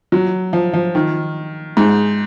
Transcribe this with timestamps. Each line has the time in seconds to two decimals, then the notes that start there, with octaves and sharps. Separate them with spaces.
0.12 F#3
0.53 F3
0.73 F3
0.95 D#3
1.77 G#2